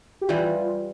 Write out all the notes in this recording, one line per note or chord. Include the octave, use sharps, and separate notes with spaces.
G4
E3 G3 F4